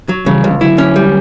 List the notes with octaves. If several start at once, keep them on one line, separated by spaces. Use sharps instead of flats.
F#3
C#3 E3 G3
C#2
D3 F#3 E4
C#4
G3